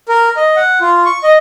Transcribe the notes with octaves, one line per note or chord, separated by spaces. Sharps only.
A#4
D#5
F#5
F4
C#6
D#5